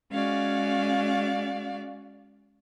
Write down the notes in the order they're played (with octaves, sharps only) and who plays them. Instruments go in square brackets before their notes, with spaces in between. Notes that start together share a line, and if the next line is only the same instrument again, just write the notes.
[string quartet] G#3 C#4 F#4 D5 F5